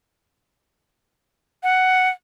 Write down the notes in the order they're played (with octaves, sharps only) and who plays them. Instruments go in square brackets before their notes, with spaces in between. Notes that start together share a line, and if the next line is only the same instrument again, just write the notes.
[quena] F#5